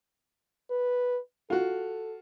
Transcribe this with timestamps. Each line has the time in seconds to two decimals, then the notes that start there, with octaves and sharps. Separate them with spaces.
0.71 B4
1.50 F4 F#4 A4